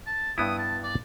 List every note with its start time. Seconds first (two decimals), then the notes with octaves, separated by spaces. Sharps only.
0.07 A5
0.38 G2 B3 E4 D#6
0.58 A5
0.83 D5